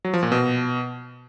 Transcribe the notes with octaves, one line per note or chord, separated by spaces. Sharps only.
F#3
F3
A#2
B2